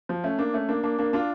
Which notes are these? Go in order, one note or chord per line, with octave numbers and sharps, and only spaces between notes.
F3
A3 C#4
A#3 D4
A3 C#4
A#3 D4
A#3 D4
A#3 D4
D4 F4